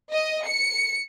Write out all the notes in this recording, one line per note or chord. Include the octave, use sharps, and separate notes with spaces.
D#5
C#7